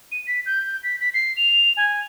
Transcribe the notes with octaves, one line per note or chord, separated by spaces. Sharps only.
D#7
B6
G6
B6
B6
C7
F7
G#5